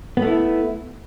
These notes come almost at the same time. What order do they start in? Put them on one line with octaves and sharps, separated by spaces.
B3 A3 E4